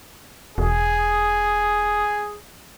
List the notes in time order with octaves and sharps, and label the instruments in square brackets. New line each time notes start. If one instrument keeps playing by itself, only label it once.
[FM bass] E1 [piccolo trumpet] G#4